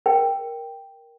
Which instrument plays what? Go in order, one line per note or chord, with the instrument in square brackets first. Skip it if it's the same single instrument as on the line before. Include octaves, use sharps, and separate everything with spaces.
[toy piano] A#4 G5